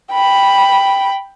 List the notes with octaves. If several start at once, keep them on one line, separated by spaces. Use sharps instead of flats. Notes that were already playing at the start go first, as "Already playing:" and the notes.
G5 B5